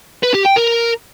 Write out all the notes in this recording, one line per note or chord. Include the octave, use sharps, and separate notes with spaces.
B4
G4
G5
A#4